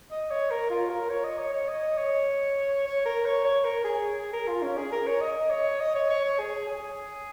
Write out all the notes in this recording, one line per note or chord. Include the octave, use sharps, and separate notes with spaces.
D#5
C#5
A#4
F4
A#4
C#5
D#5
C#5
C#5
D#5
C#5
C#5
A#4
C#5
C#5
A#4
G#4
G#4
A#4
F4
C#4
G#4
A#4
C#5
D#5
C#5
D#5
C#5
C#5
C#5
G#4
G#4